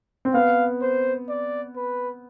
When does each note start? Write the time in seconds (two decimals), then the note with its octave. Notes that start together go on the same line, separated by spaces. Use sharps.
0.25 C4
0.34 B3 F5
0.81 C5
1.29 D5
1.76 B4